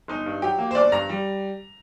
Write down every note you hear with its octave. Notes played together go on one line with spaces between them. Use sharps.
G1 D#4
G2
F#3 G4
A#3
C5
G1 D5
G2 A#5
G3